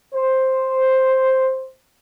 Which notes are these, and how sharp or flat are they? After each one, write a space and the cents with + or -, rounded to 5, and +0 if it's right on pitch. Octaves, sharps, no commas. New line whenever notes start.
C5 +5